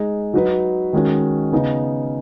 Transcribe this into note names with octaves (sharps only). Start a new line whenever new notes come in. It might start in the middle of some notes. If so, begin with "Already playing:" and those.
Already playing: G#3 D#4 G#4
F#3 D#4 F#4 B4
D#3 G#3 C#4 F#4
C#3 B3 D#4